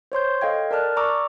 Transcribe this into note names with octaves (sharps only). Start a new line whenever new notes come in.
C5 C#5 C6 G6
A4 D#5 F5 G5 G#6
A#4 D5 A5 F6 F#6
D5 A#5 C#6 D6 E6